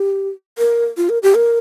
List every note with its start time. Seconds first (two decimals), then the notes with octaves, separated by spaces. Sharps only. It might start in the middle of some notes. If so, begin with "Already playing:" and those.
Already playing: G4
0.58 A#4
0.97 F4
1.09 A#4
1.23 G4
1.35 A#4